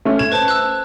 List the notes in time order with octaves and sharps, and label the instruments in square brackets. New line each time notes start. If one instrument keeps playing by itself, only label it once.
[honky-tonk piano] A3 C#4
[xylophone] G#6 [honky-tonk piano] E7
[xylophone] B4 C5 A5
E6 F#6